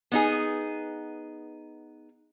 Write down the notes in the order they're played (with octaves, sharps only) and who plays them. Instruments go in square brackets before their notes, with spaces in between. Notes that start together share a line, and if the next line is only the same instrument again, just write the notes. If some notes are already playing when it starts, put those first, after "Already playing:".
[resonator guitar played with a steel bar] B3 D#4 G#4